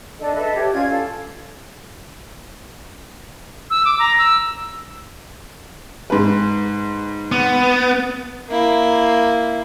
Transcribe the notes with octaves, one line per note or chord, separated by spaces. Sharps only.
D4 A4 D#5
A4 B4 D#5 E5
G4 C#5
C#4 F4 D5 G#6
A4 F5
E6
D6
A#5
E6
G#2 B4
B3
A#3 E4